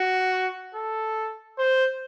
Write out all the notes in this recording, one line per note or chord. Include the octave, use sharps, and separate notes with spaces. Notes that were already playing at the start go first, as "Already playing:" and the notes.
Already playing: F#4
A4
C5